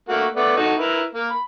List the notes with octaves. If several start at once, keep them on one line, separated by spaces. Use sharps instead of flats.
A3 A#3 F#4
A3 B3 D5
D#4 F#4 A4
E4 A#4 B4
A#3
B5